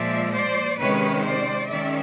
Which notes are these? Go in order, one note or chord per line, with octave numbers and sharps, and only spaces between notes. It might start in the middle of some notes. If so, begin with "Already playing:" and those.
Already playing: A#2 F3 G#3 D5 E5
C5 D5
C3 D#3 G#3 C#4 B4 C#5
C5 D5
D#3 G#3 C#4 D5 E5